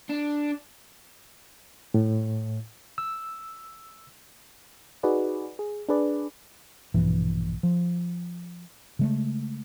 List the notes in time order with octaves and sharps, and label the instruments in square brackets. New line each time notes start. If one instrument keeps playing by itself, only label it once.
[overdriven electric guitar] D4
[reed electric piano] A2
E6
[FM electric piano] D#4 F#4 G#4 B4 D5
G#4
D4 G#4 B4 D5
[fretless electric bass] A#1 G2 B2 E3
F3
C#3 G#3 A3